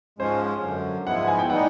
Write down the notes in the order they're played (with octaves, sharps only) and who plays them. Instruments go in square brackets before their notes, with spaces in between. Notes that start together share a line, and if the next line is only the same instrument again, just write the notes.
[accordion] G#2 F3 G#3 C#4 [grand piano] C5
[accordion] F#2 D3 F#3
[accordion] G#2 F3 G#3 B3 E4 [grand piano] F#5
[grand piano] G#5
G5
[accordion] A2 E3 G3 B3 D#4 [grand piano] F#5